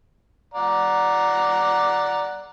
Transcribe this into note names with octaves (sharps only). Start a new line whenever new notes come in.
D5 F#5 A#5